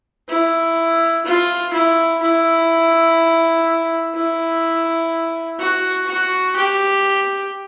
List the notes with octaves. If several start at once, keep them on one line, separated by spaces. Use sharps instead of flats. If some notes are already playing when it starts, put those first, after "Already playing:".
E4
F4
E4
E4
E4
F#4
F#4
G4